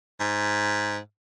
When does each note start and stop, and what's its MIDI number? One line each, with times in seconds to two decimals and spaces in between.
0.20 0.99 44